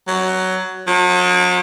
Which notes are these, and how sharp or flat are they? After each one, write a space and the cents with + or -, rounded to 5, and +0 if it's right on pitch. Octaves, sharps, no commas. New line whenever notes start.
F#3 +10
F#3 -45